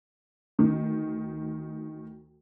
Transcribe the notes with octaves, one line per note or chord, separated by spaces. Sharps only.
D2 D#3